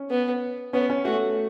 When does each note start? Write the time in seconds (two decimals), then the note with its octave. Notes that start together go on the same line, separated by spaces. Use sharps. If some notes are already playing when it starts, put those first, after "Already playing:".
Already playing: C#4
0.10 B3
0.73 B3 C#4
0.90 C#4
1.05 A3 F#4